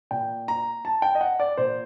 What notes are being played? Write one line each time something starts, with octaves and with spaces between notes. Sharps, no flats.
A#2 G5
A#5
A5
G5
D#5
F#5
D5
A#2 C5